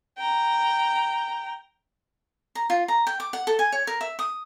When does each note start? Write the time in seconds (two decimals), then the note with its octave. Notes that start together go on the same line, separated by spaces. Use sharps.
0.18 G5 A#5
2.55 A#5
2.70 F4
2.88 A#5
3.07 G5
3.20 D6
3.33 F#5
3.47 A4
3.59 G#5
3.72 C#5
3.87 A#4
4.01 E5
4.19 D#6